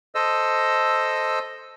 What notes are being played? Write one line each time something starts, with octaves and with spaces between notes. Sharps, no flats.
A4 C5 D#5 E6